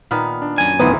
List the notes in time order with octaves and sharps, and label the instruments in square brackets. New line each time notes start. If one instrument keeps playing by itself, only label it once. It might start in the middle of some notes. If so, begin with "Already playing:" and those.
[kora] A#2 D#3 B3 [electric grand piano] F6
[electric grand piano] D4
[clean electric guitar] F#2 G#5
[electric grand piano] G#1 D2 D#6 [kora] D#3 E3 C4 [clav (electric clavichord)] B3